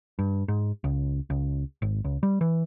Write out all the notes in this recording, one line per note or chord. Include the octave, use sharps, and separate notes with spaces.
G2
G#2
C#2
C#2
G#1
C#2
G3
E3